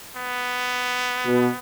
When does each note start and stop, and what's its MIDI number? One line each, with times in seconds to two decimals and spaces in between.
0.16 1.59 59
1.26 1.48 47